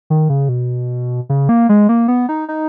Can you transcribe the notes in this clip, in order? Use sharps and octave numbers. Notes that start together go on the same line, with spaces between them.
D#3
C#3
B2
C#3
A#3
G#3
A#3
B3
D#4
D#4